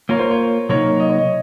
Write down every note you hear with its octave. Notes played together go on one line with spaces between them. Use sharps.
A#3 F4 A#4 C#5
C5
C#5
C3 F#3 A#3 D#4 C#5
D#5
C#5
D#5